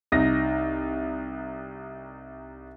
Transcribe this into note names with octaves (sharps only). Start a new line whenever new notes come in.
C2 D#4 A#6